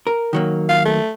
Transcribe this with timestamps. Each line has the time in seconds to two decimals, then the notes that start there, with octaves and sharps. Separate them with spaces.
0.07 A#4
0.33 D#3 F#3 A#3
0.69 F5
0.85 A3